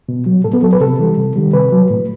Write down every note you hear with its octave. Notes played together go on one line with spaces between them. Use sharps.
B2
F#3
A2 A4
B3
F#3 A4
B4
C3 A4
E3 G3
C3
D#3 G3
C3 B4
F#3
A2